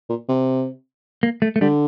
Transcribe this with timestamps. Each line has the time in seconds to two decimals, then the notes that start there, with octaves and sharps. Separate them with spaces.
0.10 A#2
0.29 C3
1.23 A#3
1.42 A3
1.56 A3
1.61 D3 G3